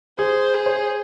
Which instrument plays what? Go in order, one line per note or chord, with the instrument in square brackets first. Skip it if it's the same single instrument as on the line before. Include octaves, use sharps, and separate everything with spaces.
[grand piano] G#4 [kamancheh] C5
[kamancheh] G#4
[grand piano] C5